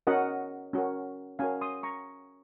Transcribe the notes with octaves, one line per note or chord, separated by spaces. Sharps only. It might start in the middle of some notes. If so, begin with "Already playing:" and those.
C#4 F#4 A#4 D#5 F#5
C#4 F#4 A#4
C#4 F#4 A#4 F5 G#5
C6 D#6
A#5 C#6